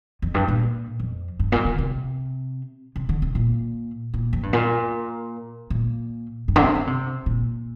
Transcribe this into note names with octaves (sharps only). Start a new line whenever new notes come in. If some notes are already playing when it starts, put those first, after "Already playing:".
F2
G2
A#2
F2
G2
A#2
D3
C3
C3
D3
C3
A#2
A#2
F2
G2
A#2
A#2
G2
D3
C3
D3
C3
A#2